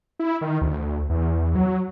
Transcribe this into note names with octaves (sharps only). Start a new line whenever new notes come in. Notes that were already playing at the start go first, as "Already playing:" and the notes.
E4
D#3
D2
E2
F#3